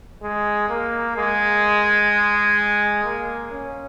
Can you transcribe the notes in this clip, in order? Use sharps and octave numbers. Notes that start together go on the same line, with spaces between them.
G#3
A#3
G#3
A#3
C#4